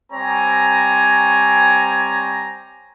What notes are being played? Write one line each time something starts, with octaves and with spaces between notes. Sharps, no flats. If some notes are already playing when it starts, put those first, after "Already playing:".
G3 C4 C#5 G#5 A#5